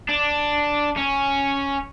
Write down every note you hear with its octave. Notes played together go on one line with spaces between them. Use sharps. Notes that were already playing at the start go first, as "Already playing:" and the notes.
D4
C#4